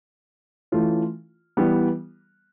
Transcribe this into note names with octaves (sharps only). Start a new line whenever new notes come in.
E3 A3 C#4 F4
E3 G3 B3